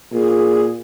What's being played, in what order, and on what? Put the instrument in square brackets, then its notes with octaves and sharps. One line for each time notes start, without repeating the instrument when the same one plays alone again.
[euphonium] A#2 [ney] G#4